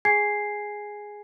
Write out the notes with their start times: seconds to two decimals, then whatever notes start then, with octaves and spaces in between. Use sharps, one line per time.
0.05 G#4 G#5 G#6 C7